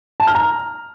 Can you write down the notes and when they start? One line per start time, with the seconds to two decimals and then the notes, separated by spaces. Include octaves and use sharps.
0.20 A5
0.27 F6
0.35 A#5